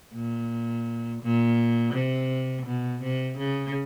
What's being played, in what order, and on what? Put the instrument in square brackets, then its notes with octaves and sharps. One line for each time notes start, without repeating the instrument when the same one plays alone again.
[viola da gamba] A#2
A#2
C3
B2
C3
C#3